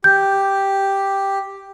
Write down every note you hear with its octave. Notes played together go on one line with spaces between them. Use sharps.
G4 G6